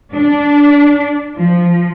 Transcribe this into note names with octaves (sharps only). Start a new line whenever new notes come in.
D4
F3